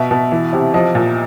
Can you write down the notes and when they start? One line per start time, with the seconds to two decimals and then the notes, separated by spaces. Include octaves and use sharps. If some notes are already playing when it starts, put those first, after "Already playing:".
Already playing: B2 E5
0.11 B2
0.32 E3
0.53 C3
0.74 F3 D#5
0.95 A#2